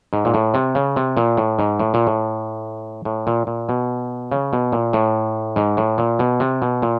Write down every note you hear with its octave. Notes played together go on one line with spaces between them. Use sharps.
G#2
A#2
A2
C3
C#3
C3
A#2
A2
G#2
A2
A#2
A2
A2
A#2
A#2
B2
C#3
B2
A#2
A2
G#2
A2
A#2
B2
C3
B2
A#2